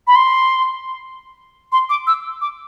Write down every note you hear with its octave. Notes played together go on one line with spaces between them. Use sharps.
B5
C6
C6
D6
E6
D6